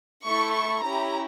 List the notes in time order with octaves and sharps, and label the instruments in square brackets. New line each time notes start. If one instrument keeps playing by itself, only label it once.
[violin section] A3 E4 A4 C#6
C#6
C#4 E4 G4 A#5